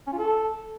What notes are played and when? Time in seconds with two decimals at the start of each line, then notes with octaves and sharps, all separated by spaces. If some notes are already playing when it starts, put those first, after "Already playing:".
0.07 C#4
0.13 F4
0.18 A4